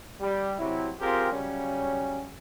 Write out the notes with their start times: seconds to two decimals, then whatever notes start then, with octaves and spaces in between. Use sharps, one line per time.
0.21 G3
0.59 C3 F#3 E4
1.00 C4 F4 G4 G#4 A#4
1.32 C#3 F#3 G3 C#4